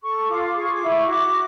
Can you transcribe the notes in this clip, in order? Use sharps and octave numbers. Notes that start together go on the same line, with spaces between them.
A4 C#6
F4 D6
G#4 C#6
D6
E4
C#6
F#4 D6